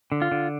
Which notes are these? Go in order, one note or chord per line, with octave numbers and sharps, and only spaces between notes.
D3
F4
D3